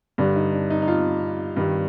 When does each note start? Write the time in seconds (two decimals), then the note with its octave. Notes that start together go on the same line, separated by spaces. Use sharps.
0.18 G2 D3 G3 D4
0.36 D#4
0.52 D4
0.70 D#4
0.82 D#4
0.88 F4
1.57 G2 D#3 G3